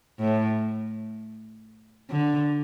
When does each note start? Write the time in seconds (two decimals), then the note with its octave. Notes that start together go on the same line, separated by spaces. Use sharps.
0.19 A2
2.10 D3